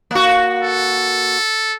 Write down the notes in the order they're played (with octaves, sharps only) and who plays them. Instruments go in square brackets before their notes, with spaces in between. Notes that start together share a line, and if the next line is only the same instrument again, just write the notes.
[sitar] A#3 F#4
[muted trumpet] A4